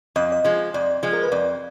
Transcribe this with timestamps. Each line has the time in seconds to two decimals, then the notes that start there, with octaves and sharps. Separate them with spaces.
0.16 F2 D#5
0.32 D#5
0.44 F3 G#3
0.74 F2 D5
1.03 F3 G#3
1.13 A#4
1.23 B4
1.32 F2 D5